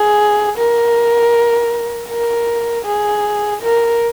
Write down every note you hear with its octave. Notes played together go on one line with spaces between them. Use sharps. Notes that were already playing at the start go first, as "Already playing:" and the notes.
Already playing: G#4
A#4
A#4
G#4
A#4